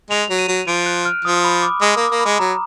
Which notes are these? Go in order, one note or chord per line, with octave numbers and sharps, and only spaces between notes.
G#3 F7
F#3
D#7
F#3
F3 D7
F#6
F6
F3 D#6
B5
D6
G#3 D#6
A#3
D6
A#3
B5
G#3
F#3 A#5